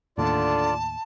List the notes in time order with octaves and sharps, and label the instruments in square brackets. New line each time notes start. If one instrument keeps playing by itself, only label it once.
[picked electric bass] D#2 A2 [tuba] D3 [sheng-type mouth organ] F4 D5 [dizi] A5